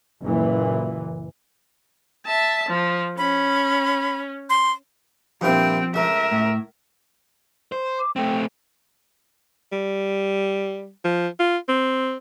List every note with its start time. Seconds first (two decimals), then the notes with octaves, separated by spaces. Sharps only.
0.23 F#1 A#2 E3
2.26 E5 A5
2.69 F3
3.18 C#4 B5
4.50 C6
5.41 G2 A#2 F3 C4 E4 G5
5.94 C#2 A3 A#4 E5
6.31 A2
7.72 C5
7.99 D6
8.16 A3 C4 G5
9.72 G3
11.04 F3
11.39 F4
11.68 C4